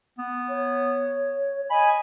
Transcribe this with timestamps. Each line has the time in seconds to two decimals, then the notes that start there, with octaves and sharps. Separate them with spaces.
0.19 B3
0.49 C#5
1.70 D#5 G#5 B5